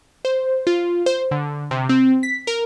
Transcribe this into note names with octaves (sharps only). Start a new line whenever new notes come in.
C5
F4
C5
D3
C3
C4
B6
A#4